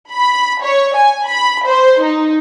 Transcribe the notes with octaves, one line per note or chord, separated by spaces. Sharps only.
B5
C#5
G#5
B5
C5
D#4